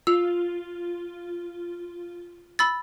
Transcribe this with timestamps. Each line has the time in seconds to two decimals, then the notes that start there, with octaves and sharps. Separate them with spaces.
0.07 F4 E6
2.59 B5 E6 A6